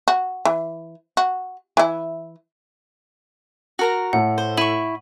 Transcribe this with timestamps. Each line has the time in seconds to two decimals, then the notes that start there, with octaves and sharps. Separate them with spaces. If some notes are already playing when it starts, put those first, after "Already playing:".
0.08 F#4
0.45 E3
1.17 F#4
1.77 E3 E4
3.79 F#4 A#4 A#5
4.13 A2 A3 F#5
4.38 C5
4.57 E4 C#6 D#7 F#7